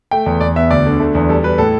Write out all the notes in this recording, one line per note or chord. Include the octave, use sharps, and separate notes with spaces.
A3 G5
E2
E2 D5
B3 E5
D2 D5
D3
A3
E2
G3 A4
G3 B4
A2 A4